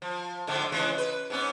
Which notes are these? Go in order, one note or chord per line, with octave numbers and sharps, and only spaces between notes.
F3
G#2 D3 F3
C#3 E3 G#3
B4
G#2 B3 C#4